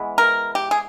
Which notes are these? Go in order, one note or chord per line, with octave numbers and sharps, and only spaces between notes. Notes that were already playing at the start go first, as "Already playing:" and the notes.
Already playing: E3 G#3 B3
A#4
G4
G#4